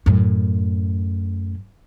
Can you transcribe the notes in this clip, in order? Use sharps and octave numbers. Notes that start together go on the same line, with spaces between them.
F#2 A2